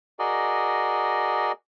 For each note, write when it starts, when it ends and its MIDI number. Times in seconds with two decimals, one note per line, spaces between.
0.19 1.52 66
0.19 1.52 68
0.19 1.52 70
0.19 1.52 74
0.19 1.52 75